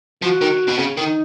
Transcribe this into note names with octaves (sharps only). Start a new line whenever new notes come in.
F3 F#4
D#3
B2
C#3
D#3 D#4